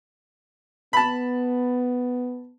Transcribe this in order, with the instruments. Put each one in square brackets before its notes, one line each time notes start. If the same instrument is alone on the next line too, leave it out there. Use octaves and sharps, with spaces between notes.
[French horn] B3 [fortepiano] A5 B5